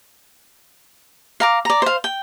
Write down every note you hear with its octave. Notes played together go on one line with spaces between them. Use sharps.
F5 A#5 D6
D5 A#5
C5 F5
G5